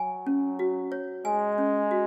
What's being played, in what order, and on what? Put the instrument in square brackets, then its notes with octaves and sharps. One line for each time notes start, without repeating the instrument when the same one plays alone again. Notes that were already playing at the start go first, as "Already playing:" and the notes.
Already playing: [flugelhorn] F#3 [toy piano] G#5
[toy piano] C#4
F#4
C#5
[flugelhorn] G#3 [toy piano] G#5
[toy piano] C#4
F#4